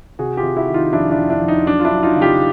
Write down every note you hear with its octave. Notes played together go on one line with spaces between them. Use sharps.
C3 F#4 G#4
F4 G4
C3
E4 F#4
D#3
D#4 F4
F2 D4 E4
D4 E4
F2
D4 E4
F2
D#4
F#3 D4
F4
D4 E4
F#3
D#4 F4
C#3
F4 G4